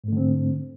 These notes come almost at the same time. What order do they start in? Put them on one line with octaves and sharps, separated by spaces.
G#2 A3 D3 C4